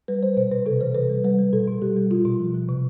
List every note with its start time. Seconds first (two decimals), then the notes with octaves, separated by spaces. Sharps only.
0.08 G3 B4
0.22 G3 C5
0.37 B2 C5
0.51 B2 B4
0.66 C3 A4
0.81 E3 C5
0.95 C3 B4
1.09 G3
1.24 G3 B4
1.39 G3
1.53 B2 A4
1.67 B2
1.82 G3 G4
1.97 G3
2.11 B2 F4
2.25 B2
2.40 F3
2.54 F3
2.69 C3